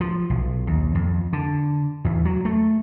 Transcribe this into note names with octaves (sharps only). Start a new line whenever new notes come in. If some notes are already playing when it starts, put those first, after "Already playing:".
F3
B1
D#2
F2
D3
E2
F#3
A3